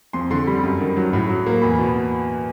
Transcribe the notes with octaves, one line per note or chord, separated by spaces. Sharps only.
F2 C6
D3 C6
G3 B5
F#2
D#3
F#3
A2
F#3
A#3
E2 B5
B5
B2